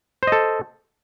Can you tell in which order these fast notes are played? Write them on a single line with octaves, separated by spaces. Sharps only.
C5 D#5 A4